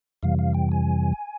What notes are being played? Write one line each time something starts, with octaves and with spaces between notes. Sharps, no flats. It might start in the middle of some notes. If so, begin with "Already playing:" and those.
F2 C3 E3 G3 F5
F5
G5
G#5